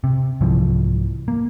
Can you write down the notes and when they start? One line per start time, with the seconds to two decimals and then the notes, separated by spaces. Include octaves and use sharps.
0.04 C3
0.41 C2 G#2 E3 F3
1.28 A#3